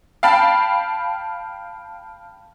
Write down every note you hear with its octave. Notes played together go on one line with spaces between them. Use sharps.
F5 G5 A5 B5